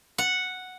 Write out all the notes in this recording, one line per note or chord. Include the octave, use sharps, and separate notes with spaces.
F#5